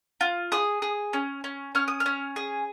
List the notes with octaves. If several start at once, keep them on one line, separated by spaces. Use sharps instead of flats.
F4
G#4 D#6
G#4
C#4
C#4
C#4 F6
D#6
F6
C#4
G#4